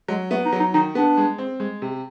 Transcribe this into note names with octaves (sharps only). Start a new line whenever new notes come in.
F#3 G#3
A3 B3
D#4
F#3
D#4
D#3 D#4
B3 D4
G#3
C4
G#3
C3